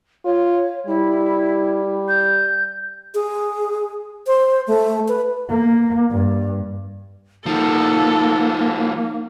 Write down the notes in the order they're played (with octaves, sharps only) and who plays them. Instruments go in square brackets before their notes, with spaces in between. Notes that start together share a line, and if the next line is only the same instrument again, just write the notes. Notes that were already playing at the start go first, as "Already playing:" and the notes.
[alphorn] F4 [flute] C#5
[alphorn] G3 [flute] E4
[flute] G6
[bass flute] G#4
C5
A3
B4
[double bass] A#3
G2
[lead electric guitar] F3 G3 [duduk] A#3 [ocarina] D#4 [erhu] A4